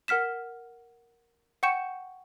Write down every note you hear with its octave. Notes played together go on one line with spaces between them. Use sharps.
A#4 F#5 F6 B6 E7
F#5 G5 C#6 G6 C#7 E7